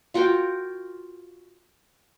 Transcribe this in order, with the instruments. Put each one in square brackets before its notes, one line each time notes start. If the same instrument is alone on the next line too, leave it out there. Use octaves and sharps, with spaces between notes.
[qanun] F4 F#4 A#4 G5